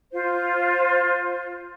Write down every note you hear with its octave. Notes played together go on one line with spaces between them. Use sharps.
F4 C5